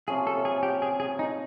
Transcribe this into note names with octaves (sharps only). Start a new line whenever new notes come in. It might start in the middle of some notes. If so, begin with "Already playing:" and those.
C3 F3 A#3 C#4 G#4
A4
G#4
G4
G#4
G#4
D#4